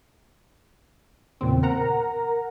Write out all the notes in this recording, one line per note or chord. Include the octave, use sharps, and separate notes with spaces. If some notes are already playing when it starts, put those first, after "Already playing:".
E2 A#2 C#3 C4
A#4 F#5 A#5